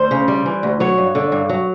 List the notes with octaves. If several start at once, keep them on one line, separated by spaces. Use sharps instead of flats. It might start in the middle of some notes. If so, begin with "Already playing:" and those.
Already playing: D2 C5
C#3
G3
E3
D2
F#3 C#5
G2
D3
G2
F#3